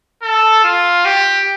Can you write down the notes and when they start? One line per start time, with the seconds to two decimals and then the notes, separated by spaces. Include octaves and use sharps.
0.23 A4
0.64 F4
1.05 G4